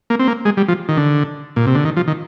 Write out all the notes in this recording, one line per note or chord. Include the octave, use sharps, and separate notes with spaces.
A#3
C4
A#3
G#3
G3
F3
D#3
D3
A#2
C3
D3
D#3
F3
D#3